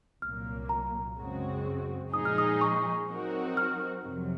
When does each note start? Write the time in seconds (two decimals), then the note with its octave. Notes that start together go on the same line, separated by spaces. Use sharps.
0.22 C2 A#2 F#3 A#3 F6
0.69 A#5
1.17 F#2 C#3 G#3 C4 F#4
2.13 A#2 F3 G#3 D#4 G#4 D#6
2.25 F6
2.38 D#6
2.61 C#6
3.09 F#3 C4 D#4 F#4 A#4
3.57 F6
4.04 F2 C3 F#3